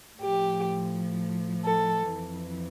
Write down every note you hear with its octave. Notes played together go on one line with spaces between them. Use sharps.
A2 F3 G4
A4
F2 E3